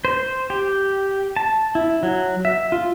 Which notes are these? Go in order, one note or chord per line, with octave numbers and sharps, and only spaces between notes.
C5
G4
A5
E4
F#3
E5
F4